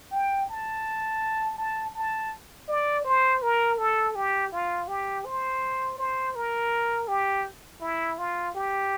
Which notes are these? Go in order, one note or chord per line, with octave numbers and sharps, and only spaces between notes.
G5
A5
A5
A5
D5
C5
A#4
A4
G4
F4
G4
C5
C5
A#4
G4
E4
F4
G4